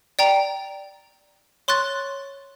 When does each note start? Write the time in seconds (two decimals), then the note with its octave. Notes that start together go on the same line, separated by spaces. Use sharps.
0.19 D5 G5 A#5
1.68 C#5 C6 C#6 F#6 A6